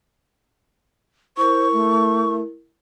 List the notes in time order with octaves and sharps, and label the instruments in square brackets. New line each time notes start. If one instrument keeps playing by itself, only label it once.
[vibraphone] E4 A#4 [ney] C5 [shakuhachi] C#6
[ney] A3